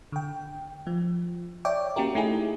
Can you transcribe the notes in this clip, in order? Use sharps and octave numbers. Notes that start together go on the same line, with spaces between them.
D3 G5
F3
C#5 D5 E5 G5 D6
A#3 C#4 F#4 G4 A#4
A3 D#4 E4 G4 G#4